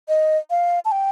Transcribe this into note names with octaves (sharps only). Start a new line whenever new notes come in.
D#5
F5
A5
G5